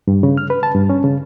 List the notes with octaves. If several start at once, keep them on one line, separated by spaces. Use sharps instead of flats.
G2
C#3
F6
B4
A5
G2
C#4
C#3